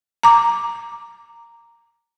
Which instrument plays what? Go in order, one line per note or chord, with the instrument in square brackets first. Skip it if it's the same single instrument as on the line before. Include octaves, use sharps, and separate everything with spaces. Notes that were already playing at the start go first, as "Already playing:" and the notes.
[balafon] A#5 D6